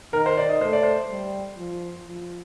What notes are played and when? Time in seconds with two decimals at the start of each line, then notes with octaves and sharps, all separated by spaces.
0.13 D#3 A#4
0.26 C5
0.37 D5
0.49 D#5
0.61 A3 C5
0.73 D5
0.83 C5
1.10 G3
1.57 F3
2.06 F3